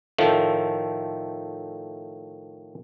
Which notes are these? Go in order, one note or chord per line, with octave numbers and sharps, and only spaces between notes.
A2 D#3 F3 A3